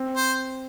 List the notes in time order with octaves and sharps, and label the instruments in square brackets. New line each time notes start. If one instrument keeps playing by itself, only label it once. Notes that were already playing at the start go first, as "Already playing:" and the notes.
Already playing: [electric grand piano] C4
[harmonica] C5